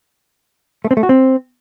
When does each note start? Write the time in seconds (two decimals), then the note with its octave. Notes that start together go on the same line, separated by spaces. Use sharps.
0.85 A3
0.91 C4
0.97 A3
1.03 F#4
1.09 C4